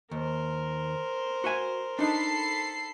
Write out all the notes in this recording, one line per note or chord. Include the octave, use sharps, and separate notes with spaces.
D#2 A#4 C5
F#4 E5 G#5
D4 D#4 A4 B5 C7